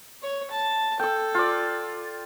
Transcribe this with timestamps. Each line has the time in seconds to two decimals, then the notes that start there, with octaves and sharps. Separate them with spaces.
0.22 C#5
0.51 A5
0.99 A4 G5 E6
1.35 F4 D5